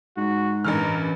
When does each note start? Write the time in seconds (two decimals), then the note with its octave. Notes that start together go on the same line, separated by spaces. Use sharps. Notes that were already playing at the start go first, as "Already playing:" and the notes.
0.17 G#2 F#4
0.64 A1 G2 E3 C#4 A#4 F6